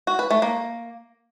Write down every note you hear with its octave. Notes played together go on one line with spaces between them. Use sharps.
F#4
B4
A3
A#3